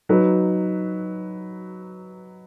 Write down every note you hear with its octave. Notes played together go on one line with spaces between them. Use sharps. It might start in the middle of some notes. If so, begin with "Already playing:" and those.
F#3 D#4 B4